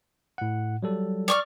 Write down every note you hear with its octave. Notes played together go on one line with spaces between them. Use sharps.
A2 F#5
F#3 G3 A4
D5 C#6 F6